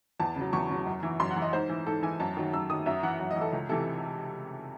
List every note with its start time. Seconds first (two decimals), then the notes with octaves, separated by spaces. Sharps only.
0.20 E2 A5
0.36 C#3 F#3
0.53 E2 C#6
0.70 C#3 F#3
0.86 F#2
1.03 E3
1.20 F#2 C6
1.30 F#5
1.36 E3
1.42 D#5
1.53 G#2 C5
1.69 E3
1.86 G#2 A4
2.03 E3 G#5
2.20 F#2 A5
2.37 D#3 F#3
2.53 F#2 E6
2.70 D#3 F#3 D#6
2.86 F#2 E5
3.03 E3 F#5
3.20 F#2
3.31 D#5
3.36 E3
3.41 A4
3.53 C#2
3.69 C3 E3 A4